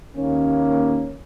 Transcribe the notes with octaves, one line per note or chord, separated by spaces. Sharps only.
D#2 A#3 C#4